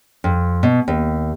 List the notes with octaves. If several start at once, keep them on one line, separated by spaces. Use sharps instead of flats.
F2
B2
D#2